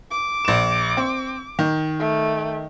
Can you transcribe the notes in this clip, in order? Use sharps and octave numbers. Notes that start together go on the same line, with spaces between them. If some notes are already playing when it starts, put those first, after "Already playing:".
D6
A#1 E7
C4
D#3
A3